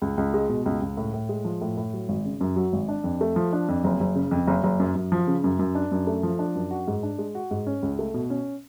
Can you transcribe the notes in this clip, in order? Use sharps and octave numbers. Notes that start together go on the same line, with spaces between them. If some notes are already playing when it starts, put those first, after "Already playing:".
C#2
C#2
G#3
B2
C#2
C#2
A2
A2
G#3
F3
A2
A2
F#3
G#1
C#3
F#2
F#3
G#1
D4
F2
A3
F3
D4
F2
F#1
F#1
C#3
F2
F#1
F#1
F#2
F#2
F3
C#3
F#2
F#2
D4
F#2
A3
F3
D4
F#2
F#4
G#2
D4
G#3
F#4
G#2
C#4
C#2
A3
B2
C#4